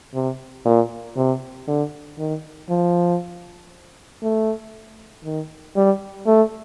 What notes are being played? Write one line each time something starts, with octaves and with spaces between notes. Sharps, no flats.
C3
A#2
C3
D3
D#3
F3
A3
D#3
G3
A3